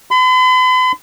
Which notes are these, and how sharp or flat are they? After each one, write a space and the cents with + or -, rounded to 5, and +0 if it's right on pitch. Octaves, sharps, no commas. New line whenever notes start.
B5 +45